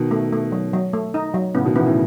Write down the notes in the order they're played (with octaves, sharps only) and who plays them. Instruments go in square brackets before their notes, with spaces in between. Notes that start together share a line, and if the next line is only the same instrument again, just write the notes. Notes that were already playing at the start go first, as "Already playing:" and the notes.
Already playing: [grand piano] B2 D#3
[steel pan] A3
A3
F#3
F#3
A3
D#4
F#3
[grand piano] A2 C#3 [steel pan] B3
[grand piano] B2 D#3
[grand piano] C#3 E3 [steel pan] B3
[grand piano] A2 C#3